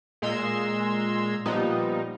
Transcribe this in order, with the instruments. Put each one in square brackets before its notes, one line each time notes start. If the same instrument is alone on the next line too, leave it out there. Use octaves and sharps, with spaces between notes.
[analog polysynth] A#2 G#3 A#5 C6 E6 G#6
A#2 F3 G3 B3 D#4